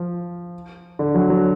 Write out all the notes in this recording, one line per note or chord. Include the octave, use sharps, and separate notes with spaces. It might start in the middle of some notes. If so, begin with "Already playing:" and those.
Already playing: F3
D3
F#3
F#3